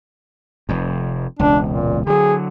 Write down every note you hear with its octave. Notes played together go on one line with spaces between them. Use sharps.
F1 F2
E1 C#2 D4
A#2
D3 F#3 G#4